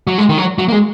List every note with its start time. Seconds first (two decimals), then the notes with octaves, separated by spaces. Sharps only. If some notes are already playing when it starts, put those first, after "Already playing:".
0.07 F#3
0.18 G#3
0.29 D#3
0.38 F#3
0.58 F#3
0.68 A#3
0.72 G#3